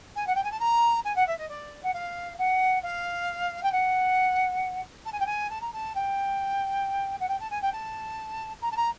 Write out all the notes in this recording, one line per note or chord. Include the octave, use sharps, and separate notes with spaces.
G#5
F#5
G5
G#5
A5
A#5
G#5
F#5
E5
D#5
D5
F#5
F5
F#5
F5
G5
F#5
A5
G#5
G5
G#5
A5
A#5
A5
G5
F#5
G5
A5
G#5
G5
A5
A#5
A5
A#5